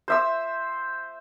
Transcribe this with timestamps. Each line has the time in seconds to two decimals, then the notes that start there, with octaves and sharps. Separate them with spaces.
0.08 C5 E5 E6